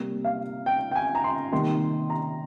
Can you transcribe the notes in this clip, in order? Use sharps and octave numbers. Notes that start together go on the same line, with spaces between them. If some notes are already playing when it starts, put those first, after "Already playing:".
Already playing: C3 G3 A#3
F5
G5
G5
G#5
A#5
C6
C3 D#3 G3 A#3 C6
A#5